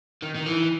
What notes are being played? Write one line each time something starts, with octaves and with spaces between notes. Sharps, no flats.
D#3
D#3
E3